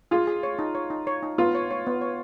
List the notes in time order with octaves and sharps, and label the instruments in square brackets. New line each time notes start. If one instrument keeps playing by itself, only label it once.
[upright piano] F4 [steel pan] G#4
[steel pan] G#4
C#5
D#4
C#5
D#4
C#5
D#4
[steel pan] B3 [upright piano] F4
[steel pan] C#5
C#5
B3
C#5